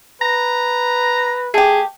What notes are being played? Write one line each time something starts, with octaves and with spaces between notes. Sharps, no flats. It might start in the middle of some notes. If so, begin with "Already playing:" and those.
B4 A#5
A3 G4 G#4